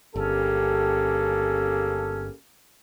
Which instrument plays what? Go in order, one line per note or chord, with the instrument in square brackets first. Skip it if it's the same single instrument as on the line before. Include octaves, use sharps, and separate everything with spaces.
[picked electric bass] G1 [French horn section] C#3 A#3 G4 [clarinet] C#4 [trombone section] A4